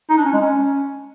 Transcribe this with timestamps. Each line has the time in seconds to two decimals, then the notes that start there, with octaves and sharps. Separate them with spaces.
0.10 D#4
0.18 D4
0.25 C#4
0.33 G#3
0.41 C#4